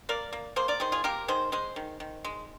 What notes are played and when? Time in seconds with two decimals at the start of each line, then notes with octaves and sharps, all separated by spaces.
0.09 A#3 A#4 D5
0.33 A#3
0.56 A#3 G#4 C5
0.68 A#4 D5
0.80 D#3 G#4 C5
0.92 F4 G#4
1.04 A#3 G4 A#4
1.28 D#3 G#4 C5
1.52 G#3 G#4 C5
1.76 D#3
2.00 D#3
2.25 G#3